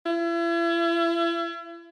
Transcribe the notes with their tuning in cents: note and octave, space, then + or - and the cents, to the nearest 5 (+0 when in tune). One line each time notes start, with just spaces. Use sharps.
E4 +40